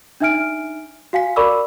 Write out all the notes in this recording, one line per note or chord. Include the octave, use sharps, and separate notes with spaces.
D4 D#4 E5 G#5 F6 D7
F#4 F5 G#5 B6
A#4 D5 B5 C#6 D6 E6